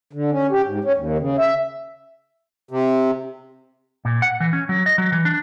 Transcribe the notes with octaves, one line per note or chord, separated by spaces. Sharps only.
D3
C#4
G4
G#2
C#4
D#2
C#3
E5
C3
A#2
F#5
E3
C#4
F#3
D#5
F#3
E3
D4